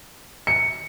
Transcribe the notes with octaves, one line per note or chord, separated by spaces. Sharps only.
C#7